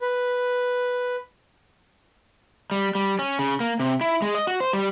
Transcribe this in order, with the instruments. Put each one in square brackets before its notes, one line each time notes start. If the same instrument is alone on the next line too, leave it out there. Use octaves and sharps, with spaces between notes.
[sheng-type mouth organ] B4
[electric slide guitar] G3
G3
C#4
C#3
A#3
C3
E4
G#3
D#5
F#4
C5
G3